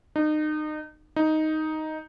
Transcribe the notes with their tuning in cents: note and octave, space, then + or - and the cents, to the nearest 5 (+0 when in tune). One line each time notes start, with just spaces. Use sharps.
D#4 -30
D#4 +5